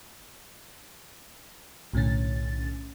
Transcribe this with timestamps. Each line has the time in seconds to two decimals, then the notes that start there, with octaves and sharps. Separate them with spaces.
1.93 B1 A2 D3 C#4 A6